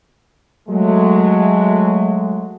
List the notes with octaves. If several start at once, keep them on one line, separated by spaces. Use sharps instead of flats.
F#3 G#3 A3